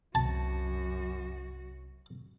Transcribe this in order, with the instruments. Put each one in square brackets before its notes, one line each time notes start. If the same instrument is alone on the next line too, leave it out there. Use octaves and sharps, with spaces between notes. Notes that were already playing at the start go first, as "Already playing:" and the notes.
[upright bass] C2 C#4 [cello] F#2 F#4 [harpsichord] A5